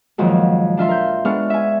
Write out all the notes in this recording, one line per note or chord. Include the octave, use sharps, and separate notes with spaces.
F2 A#2 D#3 F3 F#3 G#3
D4 F4 E5 C6
A#4 G6
G#3 B3 D4 C#6 F6
E5 G#5